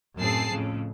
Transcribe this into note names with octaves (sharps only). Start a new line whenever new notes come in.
F#2 A2 C4 G#4 A5 C7
F2 A2 C#3